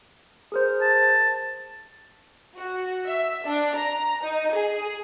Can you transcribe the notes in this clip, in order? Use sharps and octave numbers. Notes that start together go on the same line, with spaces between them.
G#4 A#4 C5
A5
F#4
E5
D4
A#5
D#4
G#4